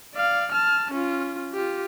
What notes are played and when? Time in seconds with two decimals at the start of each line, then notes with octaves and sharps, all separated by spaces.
0.15 D5 F5
0.52 A5 F6
0.92 C#4 F4
1.53 F4 G4